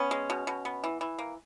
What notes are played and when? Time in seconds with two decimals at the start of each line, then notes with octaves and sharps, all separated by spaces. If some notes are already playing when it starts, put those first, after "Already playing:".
Already playing: B3 C#4
0.11 G#3
0.30 B2
0.47 B2
0.65 B3
0.84 E3
1.01 E3
1.19 A#3